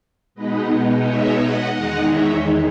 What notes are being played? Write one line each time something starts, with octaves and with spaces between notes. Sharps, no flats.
B2 G#3 B3 D#4 B4 D#5
C#5 E5
D#5 F#5
E2 D#3 G#3 D#4 D#5 F#5
C#5 E5